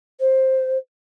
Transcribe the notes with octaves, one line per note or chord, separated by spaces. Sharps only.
C5